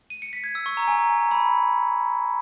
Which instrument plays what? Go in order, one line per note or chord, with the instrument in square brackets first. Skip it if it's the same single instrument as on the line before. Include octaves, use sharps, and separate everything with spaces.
[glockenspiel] D#7
C#7
B6
G#6
E6
C#6
A#5
G#5
A#5
G#5
A#5
B5